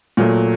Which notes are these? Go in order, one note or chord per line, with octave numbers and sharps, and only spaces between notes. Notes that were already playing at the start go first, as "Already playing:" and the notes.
A#2 F#3 A3